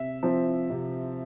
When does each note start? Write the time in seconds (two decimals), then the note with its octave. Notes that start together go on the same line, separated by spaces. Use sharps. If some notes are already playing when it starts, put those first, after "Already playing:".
Already playing: C3 E5
0.23 F3 C4
0.70 C3